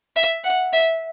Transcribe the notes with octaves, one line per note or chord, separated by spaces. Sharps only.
E5
F#5
E5